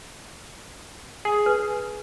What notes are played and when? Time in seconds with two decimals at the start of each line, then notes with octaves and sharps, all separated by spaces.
1.25 G#4
1.46 B4